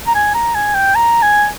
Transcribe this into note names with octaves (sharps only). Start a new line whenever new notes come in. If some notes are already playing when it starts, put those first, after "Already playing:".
A#5
G#5
A#5
G#5
G5
A#5
G#5